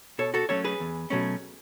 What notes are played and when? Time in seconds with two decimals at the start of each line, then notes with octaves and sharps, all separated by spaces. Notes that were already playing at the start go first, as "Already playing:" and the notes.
0.18 B2 A4 C#5
0.34 F#4 A4
0.49 F#3 A3 C#4 A4 C#5
0.64 G#4 B4
0.80 E2
1.10 B2 F#3 A3 C#4